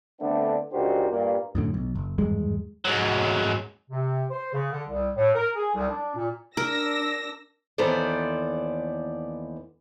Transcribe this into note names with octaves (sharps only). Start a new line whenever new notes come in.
D3 A3 B3 C4 D4
C#2 D4 F#4 G4 A#4 C5
G2 A#2 A#3
F#2 A2 D3
B1
F#1
G#1 E2 G2 G#3
G#2 F#3
C3
C5
C#3
D3
C2
A2
A#4
G#4
C2
D4
A#2
D4 A#4 E6 A#6
D#2 E3 B3 A4 C5 D5